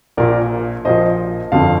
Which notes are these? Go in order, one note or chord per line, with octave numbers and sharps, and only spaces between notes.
A#1 A#2 F3 A#4 D5
A#1 A#2 F3 C5 D#5
G1 F2 D3 F3 F5 A5